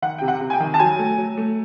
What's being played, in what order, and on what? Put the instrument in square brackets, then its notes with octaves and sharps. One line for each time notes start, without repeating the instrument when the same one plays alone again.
[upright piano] D#3 F#5
C3 G5
F#5
C3
G#5
G5
D#3
A5
F#3 G#5
A3
F#3
A3